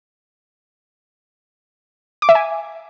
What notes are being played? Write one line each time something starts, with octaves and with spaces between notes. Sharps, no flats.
D6
E5
G#5